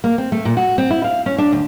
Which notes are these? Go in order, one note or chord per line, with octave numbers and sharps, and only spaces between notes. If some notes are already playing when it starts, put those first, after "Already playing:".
A#3
C4
A3
A#2
F#4
C4
E4
F5
C#4
D4
D2